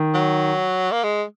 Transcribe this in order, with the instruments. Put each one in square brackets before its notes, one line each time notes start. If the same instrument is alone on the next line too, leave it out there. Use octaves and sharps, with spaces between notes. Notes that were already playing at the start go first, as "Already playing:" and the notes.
Already playing: [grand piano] D#3
[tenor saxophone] F#3
A#3
G#3